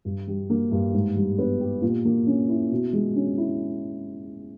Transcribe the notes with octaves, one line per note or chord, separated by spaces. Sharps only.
G2
G3
A#3
G2
G#2
G3
B3
G4
A#2
A#3
C#4
E4
B2
G#3
C#4
E4